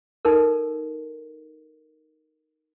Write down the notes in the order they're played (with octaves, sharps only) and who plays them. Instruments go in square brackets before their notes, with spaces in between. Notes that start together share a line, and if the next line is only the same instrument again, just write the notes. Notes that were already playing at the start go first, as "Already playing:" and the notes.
[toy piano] D#4 A4 A#4